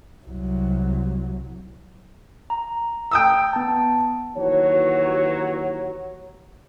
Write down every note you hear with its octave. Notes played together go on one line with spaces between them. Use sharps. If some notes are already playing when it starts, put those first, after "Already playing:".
C2 F#3
A#5
G5 D#6 E6
B3 A5
D#2 E3 F#3 F#4 C#5